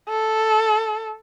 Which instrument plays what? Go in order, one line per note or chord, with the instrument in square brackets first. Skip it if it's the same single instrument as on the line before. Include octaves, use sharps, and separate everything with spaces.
[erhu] A4